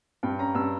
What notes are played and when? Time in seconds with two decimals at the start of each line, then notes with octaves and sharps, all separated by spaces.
0.23 G2 G5
0.39 C#4 A#5
0.54 G2 E6